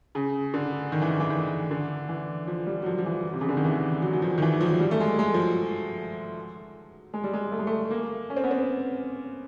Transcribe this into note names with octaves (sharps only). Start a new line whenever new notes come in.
C#3
D3
D#3
E3
D#3
E3
D#3
D3
E3
F3
G3
F#3
F3
F3
E3
C3
C#3
D3
D#3
E3
F#3
F#3
F3
D#3
E3
F3
F#3
G3
A3
G#3
G#3
F3
F#3
G#3
G3
G#3
A3
G#3
A3
A#3
C#4
C4
B3
C4